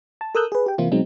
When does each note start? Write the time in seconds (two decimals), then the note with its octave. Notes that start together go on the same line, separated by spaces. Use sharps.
0.21 A5
0.35 A4 A#4 D#6 E6 F#6 G6
0.52 G#4 B4
0.66 G4 G5
0.78 C3 E3 A#3 C4 E4 F4
0.92 B2 F#3 G#3 C4 D#4